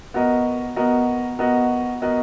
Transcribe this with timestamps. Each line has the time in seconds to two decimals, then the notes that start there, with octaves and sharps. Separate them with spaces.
0.14 B3 F#4 A#4 D#5
0.76 B3 F#4 A#4 D#5
1.39 B3 F#4 A#4 D#5
2.02 B3 F#4 A#4 D#5